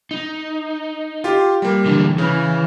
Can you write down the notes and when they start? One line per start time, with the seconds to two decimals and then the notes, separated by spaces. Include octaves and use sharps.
0.11 D#4
1.24 F4 G4
1.62 G3 A#3
1.86 D3 E3 D4
2.18 C#3 E3